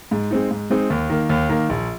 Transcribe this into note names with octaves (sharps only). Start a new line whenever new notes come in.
G#2
G#3 C4 D#4
G#2
G#3 C4 D#4
D#2
D#3 A#3
D#2
D#3 A#3
A#1